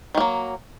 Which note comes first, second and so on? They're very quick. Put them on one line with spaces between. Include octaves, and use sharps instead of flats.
D#3 A#3 F#3